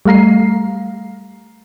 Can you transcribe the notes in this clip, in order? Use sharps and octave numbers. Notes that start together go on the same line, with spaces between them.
G3 A3 F5 A#5 C7